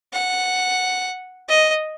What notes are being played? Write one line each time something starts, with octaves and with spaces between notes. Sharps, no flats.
F#5
D#5